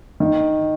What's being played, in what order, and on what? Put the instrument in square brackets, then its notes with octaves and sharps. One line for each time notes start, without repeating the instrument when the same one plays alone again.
[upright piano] D#3